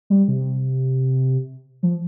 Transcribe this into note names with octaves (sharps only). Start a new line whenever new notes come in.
G3
C3
F3